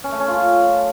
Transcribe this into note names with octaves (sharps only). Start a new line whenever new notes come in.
C#4
A3
C#4
F4